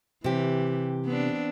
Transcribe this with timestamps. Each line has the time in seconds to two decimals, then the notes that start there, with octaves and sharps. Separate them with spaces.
0.24 C3 E3 G4
1.06 B3 C4 D4